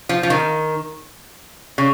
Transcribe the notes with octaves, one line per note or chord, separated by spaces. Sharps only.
F3
F3
D#3
C#3